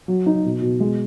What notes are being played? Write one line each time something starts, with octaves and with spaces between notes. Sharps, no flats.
F#3
D#4
B2
B2
G#3